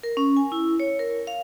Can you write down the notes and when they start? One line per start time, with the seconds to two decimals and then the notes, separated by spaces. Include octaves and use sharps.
0.03 A#4
0.17 C#4
0.37 G#5
0.52 E4
0.80 C#5
0.99 A#4
1.27 F5